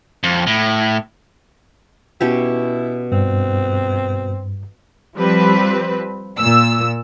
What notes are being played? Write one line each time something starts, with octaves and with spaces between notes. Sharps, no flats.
F2
A2
B2 C#4 E4 G4
G2 C4
F3 G3 C4 B4
A#2 E6